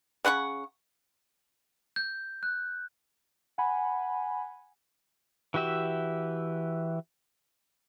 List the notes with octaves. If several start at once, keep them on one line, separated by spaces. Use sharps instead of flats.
C#3 F#5 C6 C#6
G6
F#6
F#5 G#5 B5
E3 F#4 G4 E5